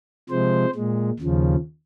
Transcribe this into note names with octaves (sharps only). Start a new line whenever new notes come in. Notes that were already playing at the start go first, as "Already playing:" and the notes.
C3 F3 G#3 C5
A#2 G#3
D#2 C#3 F3